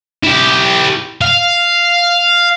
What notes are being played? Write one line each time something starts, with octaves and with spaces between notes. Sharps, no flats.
E4 G4
F5